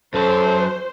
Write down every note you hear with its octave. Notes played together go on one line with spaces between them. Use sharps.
F#2 F#3 A4 C5